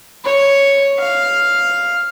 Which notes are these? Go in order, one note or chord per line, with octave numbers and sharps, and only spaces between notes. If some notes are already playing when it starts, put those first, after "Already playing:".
C#5
F5